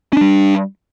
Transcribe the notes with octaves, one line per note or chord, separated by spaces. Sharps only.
G3 C#4 D4